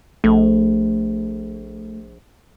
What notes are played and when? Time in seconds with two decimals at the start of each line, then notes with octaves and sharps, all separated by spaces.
0.24 A#1 A3